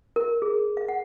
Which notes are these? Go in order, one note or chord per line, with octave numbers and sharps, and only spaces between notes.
A#4
G#4
F5
F#5